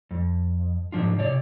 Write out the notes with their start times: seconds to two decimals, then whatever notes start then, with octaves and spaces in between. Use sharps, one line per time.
0.11 F2
0.92 G#2 F3 D4 F4
1.18 C3 C#5 D5